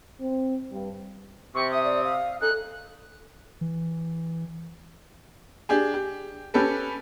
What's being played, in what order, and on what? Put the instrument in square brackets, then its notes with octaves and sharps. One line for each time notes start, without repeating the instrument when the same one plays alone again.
[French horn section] C4
G2
[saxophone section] C3 [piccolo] C#6
[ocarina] E5 [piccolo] D#6
[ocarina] D5
F5
[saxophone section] C#4 D#4 [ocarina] A4 [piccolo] F#6
[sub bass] E3
[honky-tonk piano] D4 G4 G#4
G4
C#4 G4 A4 B4